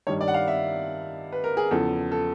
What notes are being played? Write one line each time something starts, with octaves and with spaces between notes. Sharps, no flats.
G2 D#3 G3 C#5
D5
F#5
F5
E5
B4
A#4
G#4
E2 C#3 F3 A4
A4